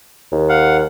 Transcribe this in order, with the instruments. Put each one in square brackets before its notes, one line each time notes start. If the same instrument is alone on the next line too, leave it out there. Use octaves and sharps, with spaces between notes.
[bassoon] D#2
[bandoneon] F5 F#5